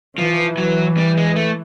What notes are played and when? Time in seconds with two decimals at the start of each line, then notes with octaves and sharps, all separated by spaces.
0.18 E3 F3
0.57 F#3
0.97 G3
1.17 G#3
1.36 A3